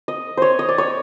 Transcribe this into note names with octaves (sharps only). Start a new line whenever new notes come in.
D#5
C5 C#5
D#5
D5
C#5